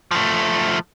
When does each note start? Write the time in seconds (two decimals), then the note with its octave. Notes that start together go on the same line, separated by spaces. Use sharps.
0.11 F3 A3